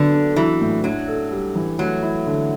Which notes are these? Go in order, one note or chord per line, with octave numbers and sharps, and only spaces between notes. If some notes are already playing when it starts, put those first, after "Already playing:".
Already playing: D3 F#3 B3
D4
E3 F#3
A2
F#3 D4
A4
G3
E3
F#3 A3
E4
D3